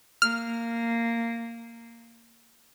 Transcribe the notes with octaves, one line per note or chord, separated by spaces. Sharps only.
A#3 F6